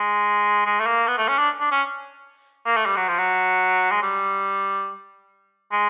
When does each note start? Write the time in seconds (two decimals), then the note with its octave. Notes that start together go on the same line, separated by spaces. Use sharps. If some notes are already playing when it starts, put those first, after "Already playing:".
Already playing: G#3
0.66 G#3
0.80 A3
0.86 A#3
1.08 B3
1.18 A3
1.29 C#4
1.39 D4
1.60 D4
1.71 C#4
2.66 A#3
2.77 A3
2.86 G3
2.97 F#3
3.08 F3
3.18 F#3
3.91 G#3
4.03 G3
5.72 G#3